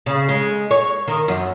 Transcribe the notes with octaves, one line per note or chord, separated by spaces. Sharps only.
C#3
G#3
C#5
D#3
F#2